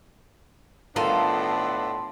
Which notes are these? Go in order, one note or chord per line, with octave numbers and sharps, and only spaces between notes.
A2 D#3 B3 D4 F4 A4 A5 C6